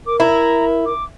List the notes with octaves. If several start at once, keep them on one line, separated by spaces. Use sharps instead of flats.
A#4 D6
E4 A#5
D6